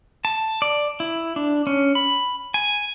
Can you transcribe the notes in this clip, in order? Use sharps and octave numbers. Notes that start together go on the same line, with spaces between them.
A5
D5
E4
D4
C#4
B5
G#5